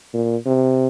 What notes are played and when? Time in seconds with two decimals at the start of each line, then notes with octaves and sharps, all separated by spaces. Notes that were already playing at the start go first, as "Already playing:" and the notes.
0.14 A#2
0.46 C3